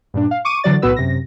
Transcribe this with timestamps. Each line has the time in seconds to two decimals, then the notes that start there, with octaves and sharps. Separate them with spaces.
0.14 G2 A#2 D4
0.31 F5
0.45 C#6 D6 D#7
0.64 D3 E3 F#3 F#4 D5 A6
0.82 B1 A2 B3 F#4 B4 E6
0.96 F#2 C3 A#6